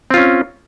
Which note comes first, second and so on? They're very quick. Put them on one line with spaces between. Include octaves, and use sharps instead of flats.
C4 F4 C#4